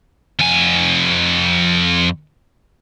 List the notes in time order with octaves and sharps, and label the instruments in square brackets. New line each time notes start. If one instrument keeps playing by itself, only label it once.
[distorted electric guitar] F2 G#5